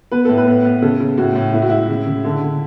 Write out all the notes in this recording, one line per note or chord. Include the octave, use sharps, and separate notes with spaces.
B3 B4
A2 A4
B4
B3
B3
C#3 A4
C#3
A2 F#4
A2
A2 E4
F#4
G#3 E4
C#3
C#3
D3
D3